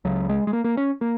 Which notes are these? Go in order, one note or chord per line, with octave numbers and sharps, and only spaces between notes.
C#2 C#3 F#3
G#3
G#3
A#3
A#3
C#4
A#3